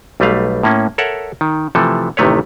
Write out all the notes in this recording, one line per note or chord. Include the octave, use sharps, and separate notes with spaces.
B1 G3 A3 B4 F5
A2 A#3 C#4
A4 A#4 C#5 E5 F#5
D#3
C3 E3 F3 A3 A4
A1 C3 D#3 A3 B4 C#5